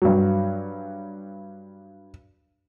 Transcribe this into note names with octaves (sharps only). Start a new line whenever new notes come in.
G2 F#3